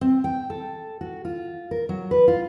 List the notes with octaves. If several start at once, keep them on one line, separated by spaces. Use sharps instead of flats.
C4
G5
A4
F#4
F4
A#4
F#3
B4
F4